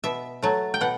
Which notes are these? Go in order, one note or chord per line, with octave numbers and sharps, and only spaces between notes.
B2 E5
F#3 A3
G5
B2 F#5